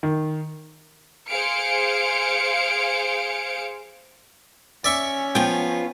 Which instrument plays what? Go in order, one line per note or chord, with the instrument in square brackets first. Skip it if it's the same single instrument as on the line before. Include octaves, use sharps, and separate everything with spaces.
[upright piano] D#3
[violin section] G#4 C5 F5 C#7 D7
[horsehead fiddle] C#4 [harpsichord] D5 E5 C#6
[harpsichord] F3 [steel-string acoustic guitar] B3 F4 [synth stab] G5